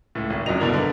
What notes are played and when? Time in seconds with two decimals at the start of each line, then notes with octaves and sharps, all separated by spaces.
0.15 C#2 A2
0.30 G#1
0.46 G#1 F#2 F3 F#3 D#5 F7
0.60 B2 D3 G3 D4 E4 A#4
0.73 D3 A#3 B3